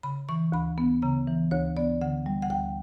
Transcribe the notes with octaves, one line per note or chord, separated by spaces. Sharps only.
C#3 B5
E3 C#6
D2 B5
B3
C#3 A#5
E3
D2 C#5
B3 D5
D3 F#5
G3
F#5
D2 G5